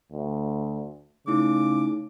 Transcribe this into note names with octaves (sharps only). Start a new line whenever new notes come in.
D2
C#3 A3 D#4 E4 D6